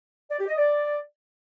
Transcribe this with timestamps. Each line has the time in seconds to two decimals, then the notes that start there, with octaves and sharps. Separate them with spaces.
0.30 D5
0.39 G4
0.48 D#5
0.57 D5